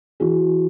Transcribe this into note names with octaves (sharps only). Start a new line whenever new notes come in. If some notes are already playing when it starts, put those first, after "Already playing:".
E3 F#4 G#4